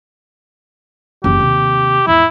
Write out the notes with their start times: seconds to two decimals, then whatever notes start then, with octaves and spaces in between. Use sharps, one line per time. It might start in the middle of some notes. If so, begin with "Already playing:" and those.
1.24 F#1 E3 G4
1.40 D#2 C3
2.07 E2 G#2 E4